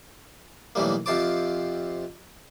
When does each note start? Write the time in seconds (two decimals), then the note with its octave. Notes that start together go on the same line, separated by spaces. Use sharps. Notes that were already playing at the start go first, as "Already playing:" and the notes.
0.75 B1 A2 E3 G3 A#3
1.06 F2 C3 F4 C5 A5 D6